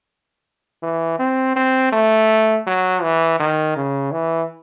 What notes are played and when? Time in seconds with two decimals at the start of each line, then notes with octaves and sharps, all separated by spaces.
0.83 E3
1.19 C4
1.56 C4
1.92 A3
2.67 F#3
3.02 E3
3.40 D#3
3.76 C#3
4.12 E3